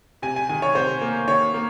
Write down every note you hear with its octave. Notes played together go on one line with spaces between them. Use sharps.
C3 G#5
G#5
D#3 G#5
C#5
C3 C5
A#3
D#3 C#5
A#3